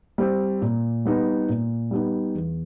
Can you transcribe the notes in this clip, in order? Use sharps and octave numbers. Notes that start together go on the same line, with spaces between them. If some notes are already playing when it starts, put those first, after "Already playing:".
G3 C4
A#2
G3 B3 D#4
A#2
G3 B3 D#4
E2